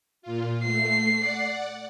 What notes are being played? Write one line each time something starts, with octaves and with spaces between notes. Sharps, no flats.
A#2 F4
A3 C7
D5 F#5